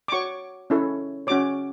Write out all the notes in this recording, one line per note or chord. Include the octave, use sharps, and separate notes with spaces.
D6
F#4 C#5 C#6
C#4 E4 A4 C#5
C#4 F#4 C#5 D6